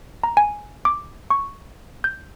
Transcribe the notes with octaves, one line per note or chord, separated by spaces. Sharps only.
A#5
G#5
D6
C#6
G6